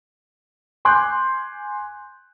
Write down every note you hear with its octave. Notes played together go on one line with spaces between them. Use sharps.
G#5 C6 D6 F#6 G6